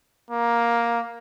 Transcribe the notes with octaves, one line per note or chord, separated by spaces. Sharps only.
A#3